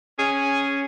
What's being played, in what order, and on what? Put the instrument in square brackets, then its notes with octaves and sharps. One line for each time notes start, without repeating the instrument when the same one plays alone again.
[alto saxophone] C#4 [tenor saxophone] G#4